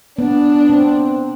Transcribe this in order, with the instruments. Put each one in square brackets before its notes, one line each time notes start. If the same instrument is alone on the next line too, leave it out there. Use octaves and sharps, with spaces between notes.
[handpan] B3 [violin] D4
[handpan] C4